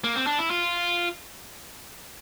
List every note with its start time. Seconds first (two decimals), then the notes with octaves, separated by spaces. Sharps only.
0.04 A#3
0.15 C4
0.27 D4
0.39 E4
0.50 F4